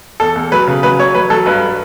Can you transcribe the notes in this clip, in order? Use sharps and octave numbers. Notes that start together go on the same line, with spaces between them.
E2 A4
E2
F#3 B4
C#3
F#3 B4
F#3 C#5
F#3 B4
F#3 A4
G2 B4